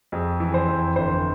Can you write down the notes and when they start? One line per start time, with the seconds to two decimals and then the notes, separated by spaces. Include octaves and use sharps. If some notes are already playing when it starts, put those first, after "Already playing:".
0.12 F2 G#4
0.40 E3
0.54 C5
0.68 F2
0.96 G1 C5